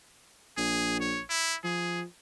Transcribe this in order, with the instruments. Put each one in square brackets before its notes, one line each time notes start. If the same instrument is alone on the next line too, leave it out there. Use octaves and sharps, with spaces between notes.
[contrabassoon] A#1 [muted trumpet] G#4
[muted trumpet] C#5
E4
[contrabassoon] F3 [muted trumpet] G#4